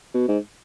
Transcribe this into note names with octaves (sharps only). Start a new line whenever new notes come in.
B2
G#2